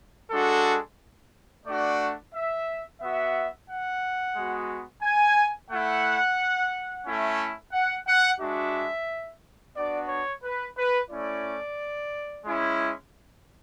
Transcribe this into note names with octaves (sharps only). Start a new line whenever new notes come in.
G#3 D4 F#4 A4
A3 D4 F#4 D5
E5
B3 F#4 E5
F#5
G#3 B3 F#4
G#5
A3 E4 F#5
A3 C#4 E4
F#5
F#5
G#3 D4 F#4 E5
B3 D4 F#4 D5
C#5
B4
B4
A3 C#4 E4 D5
G#3 C#4 E4